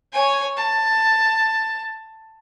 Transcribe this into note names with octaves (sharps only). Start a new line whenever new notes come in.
C#5 G#5
A5